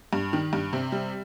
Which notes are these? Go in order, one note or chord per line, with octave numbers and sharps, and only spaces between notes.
G2
D#3
G2
C3
G3